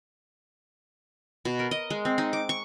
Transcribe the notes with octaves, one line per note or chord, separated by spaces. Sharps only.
B2
A#4
D#5
G#3
C4
D#4
D6
C#6